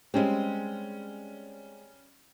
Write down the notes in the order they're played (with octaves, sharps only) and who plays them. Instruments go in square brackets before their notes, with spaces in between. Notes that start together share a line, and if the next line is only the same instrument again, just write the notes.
[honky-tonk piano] G3 C#4 [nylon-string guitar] G#3 C4